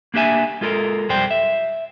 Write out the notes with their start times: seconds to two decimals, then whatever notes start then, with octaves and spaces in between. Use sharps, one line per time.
0.14 A#3 D4 G4 E5 G#5
0.61 G#3 F4 A4 A#4
1.09 B1 F2 G3 C5 G5
1.31 E5